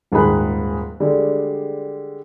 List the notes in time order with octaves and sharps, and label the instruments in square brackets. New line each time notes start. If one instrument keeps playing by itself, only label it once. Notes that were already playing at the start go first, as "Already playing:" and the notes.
[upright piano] D#1 G#2 D#3 G#4 B5 F#6
D3 G3 G#3